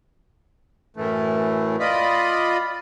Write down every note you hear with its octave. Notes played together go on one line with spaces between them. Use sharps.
F#2 A2 E3 A3
F4 D5 D#5 B5